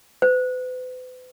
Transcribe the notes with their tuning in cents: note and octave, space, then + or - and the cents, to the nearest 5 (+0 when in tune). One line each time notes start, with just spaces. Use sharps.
B4 +45